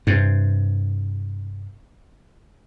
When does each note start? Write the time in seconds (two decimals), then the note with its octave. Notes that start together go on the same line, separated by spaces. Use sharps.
0.07 G2 C3